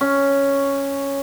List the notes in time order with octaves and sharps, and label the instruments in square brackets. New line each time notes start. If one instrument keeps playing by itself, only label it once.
[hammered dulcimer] C#4